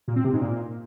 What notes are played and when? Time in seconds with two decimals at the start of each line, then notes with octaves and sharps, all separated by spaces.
0.08 A#2
0.16 C4
0.25 C3
0.33 G#2
0.41 A#2